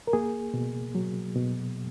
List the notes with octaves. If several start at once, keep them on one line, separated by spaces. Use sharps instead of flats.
A#4
A#3 G#4
B2
F#3
B2